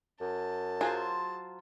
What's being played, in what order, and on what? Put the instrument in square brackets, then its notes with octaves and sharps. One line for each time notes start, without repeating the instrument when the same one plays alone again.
[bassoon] F#2 [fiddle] A5
[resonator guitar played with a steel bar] F#3 F4 C5 [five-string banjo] G#4